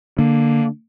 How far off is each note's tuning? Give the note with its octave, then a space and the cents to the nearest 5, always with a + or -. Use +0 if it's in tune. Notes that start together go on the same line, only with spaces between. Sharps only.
D3 +0 A#3 -5